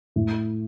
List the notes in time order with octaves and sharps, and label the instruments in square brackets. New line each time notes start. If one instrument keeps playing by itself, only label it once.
[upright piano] A2